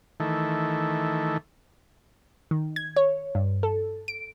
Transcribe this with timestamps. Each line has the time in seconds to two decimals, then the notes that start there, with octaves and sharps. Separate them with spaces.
0.20 D#3 E3 A3
2.51 D#3
2.76 G#6
2.96 C#5
3.35 G2
3.63 A4
4.08 D7